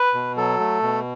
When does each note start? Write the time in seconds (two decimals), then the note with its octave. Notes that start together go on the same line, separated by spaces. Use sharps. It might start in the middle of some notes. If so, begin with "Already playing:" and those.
Already playing: B4
0.14 B2
0.37 F#3 A4
0.60 A3
0.82 B2